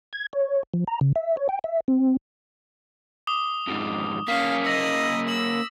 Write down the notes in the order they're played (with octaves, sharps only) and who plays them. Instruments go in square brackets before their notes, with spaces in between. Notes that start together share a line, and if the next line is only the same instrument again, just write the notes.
[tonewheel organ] G#6
C#5
F3
A#5
C#3
E5
C#5
G5
E5
C4
[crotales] D6 D#6 G7
[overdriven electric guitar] F2 G#2
[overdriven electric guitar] A#3 C#4 [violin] F5 [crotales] B6
[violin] D#5 [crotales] E6 A#6
[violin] E6 [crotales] F#7